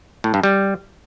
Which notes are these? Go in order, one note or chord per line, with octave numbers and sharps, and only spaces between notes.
A2
G2
G3